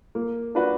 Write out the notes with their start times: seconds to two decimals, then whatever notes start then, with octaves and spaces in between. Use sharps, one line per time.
0.15 A#3
0.55 D4 F#4 B4